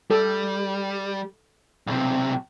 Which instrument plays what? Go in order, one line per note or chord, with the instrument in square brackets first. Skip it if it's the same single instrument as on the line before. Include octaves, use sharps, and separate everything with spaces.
[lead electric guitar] G3 [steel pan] A4
[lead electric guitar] B1 C3